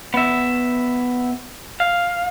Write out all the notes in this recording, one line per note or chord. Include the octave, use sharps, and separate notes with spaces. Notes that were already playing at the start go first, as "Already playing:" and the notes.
B3 E5
F5